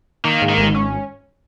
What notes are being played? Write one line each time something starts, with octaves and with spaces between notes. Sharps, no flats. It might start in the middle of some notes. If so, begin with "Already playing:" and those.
D#3 A#3
G#2
D#3
G#1
C#4